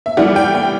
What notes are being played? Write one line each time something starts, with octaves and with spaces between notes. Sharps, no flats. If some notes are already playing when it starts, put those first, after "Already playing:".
E5
A2 E3 G3 F#5
G5
G5